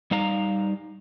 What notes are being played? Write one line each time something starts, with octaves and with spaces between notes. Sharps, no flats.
G3 D#4 F5 A#5